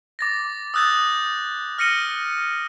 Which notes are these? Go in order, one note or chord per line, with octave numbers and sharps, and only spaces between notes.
D6 A6 A#6
D#6 E6 F#6 G6 A6
F6 A#6 C#7 D#7 G7